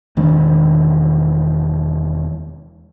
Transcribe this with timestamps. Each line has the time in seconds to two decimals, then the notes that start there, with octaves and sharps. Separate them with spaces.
0.17 E1 D#3 G#3 D4